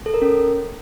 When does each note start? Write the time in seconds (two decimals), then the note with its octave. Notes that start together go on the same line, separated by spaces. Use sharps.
0.06 A4
0.14 A#4
0.22 C#4